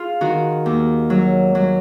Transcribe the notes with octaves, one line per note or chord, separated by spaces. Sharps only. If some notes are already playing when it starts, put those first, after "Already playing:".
Already playing: F4 G#4
D#3 F#4
D#2
F#3
F#3